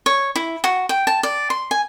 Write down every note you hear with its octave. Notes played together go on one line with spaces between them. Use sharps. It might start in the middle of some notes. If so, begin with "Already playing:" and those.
C#5
E4
F#4
G5
A5
D5
C6
G#5